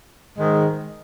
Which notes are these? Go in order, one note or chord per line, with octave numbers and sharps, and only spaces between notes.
G#2 D#3 G#3